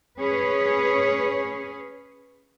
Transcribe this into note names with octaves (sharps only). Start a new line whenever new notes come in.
C#4 G#4 B4 C#5